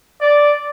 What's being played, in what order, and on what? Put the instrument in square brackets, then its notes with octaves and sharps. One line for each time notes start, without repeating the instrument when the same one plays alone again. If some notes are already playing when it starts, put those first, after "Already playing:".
[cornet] D5